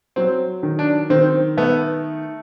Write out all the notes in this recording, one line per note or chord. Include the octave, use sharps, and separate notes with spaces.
F#3 C4
D#3
D4
D#3 C4
A3 B3